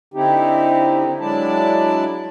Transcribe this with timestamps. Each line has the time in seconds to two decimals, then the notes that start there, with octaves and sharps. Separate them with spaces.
0.14 D3 C4 D#4 E4 G4
1.20 F#3 G#3 D4 E4 D5 A5